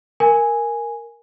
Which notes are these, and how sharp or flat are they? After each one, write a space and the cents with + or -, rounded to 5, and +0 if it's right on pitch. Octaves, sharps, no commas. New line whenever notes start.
A#4 +0 G#5 +0